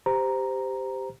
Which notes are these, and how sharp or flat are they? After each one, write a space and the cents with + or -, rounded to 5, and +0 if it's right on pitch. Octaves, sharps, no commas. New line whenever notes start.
G4 +0 C5 -15 A#5 +0